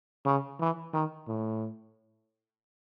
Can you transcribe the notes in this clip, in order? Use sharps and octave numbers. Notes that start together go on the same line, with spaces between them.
C#3
E3
D#3
A2